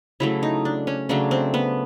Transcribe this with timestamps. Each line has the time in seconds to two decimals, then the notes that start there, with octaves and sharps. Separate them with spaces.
0.20 C#3 F#3 A3 E4
0.43 D#4
0.65 D4
0.87 C#4
1.09 C#3 F#3 A3 D4
1.31 C4
1.54 B3